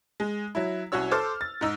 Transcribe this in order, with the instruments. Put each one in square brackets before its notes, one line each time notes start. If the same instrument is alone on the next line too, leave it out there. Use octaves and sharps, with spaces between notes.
[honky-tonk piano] G#3
F#3 E4
C2 C#4 F#4 C#5 E6
A4 C5 D6 F6
A6
G#2 D#4 E6